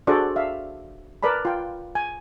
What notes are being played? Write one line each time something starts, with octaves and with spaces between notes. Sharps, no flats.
D4 F#4 G#4 A4 C5 D5
E5 F5
A#4 B4 D5 A5 B5
F4 G5
G#5